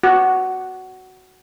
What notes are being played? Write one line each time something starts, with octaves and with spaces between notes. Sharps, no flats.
F#4